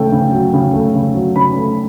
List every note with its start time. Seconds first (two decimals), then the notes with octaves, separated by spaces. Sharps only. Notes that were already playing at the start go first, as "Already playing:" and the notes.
Already playing: C#3 A3 G5
0.12 C#3
0.32 F#3
0.54 C#3
0.73 A3
0.95 C#3
1.15 F#3
1.36 C#3 B5
1.56 A3